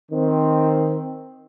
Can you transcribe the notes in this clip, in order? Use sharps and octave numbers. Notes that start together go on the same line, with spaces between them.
D#3 C4